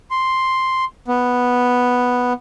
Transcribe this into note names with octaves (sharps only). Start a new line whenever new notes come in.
C6
B3